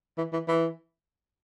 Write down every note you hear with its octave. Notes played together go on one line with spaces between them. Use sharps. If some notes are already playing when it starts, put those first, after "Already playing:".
E3
E3
E3